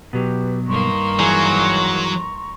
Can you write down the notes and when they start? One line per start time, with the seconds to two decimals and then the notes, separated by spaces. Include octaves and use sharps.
0.13 B2 F#3 G4 B4
0.68 G2 D#3 A#3 A#5 C6 C#6
1.19 E3 F#3 G#4